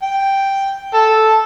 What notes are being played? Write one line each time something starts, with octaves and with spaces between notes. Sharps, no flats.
G5
A4